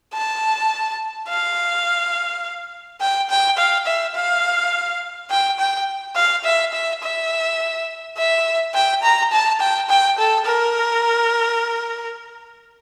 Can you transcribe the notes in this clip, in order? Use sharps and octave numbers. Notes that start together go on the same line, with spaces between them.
A5
F5
G5
G5
F5
E5
F5
G5
G5
F5
E5
E5
E5
E5
G5
A#5
A5
G5
G5
A4
A#4